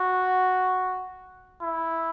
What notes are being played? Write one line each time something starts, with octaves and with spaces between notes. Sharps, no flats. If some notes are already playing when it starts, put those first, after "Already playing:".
Already playing: F#4
E4